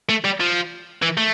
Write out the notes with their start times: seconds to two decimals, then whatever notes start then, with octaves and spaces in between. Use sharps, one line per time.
0.09 A3
0.25 G3
0.40 F3
1.02 E3
1.18 A3